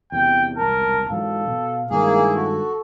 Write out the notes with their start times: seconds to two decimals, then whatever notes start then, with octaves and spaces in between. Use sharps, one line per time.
0.12 E2 C3 G5
0.57 E1 C2 A#4 A5
1.10 G#2 E3 F#3 A4 F5
1.48 B2
1.91 G2 D#3 G#3 A#3 E4 G#4
2.35 F#4 A4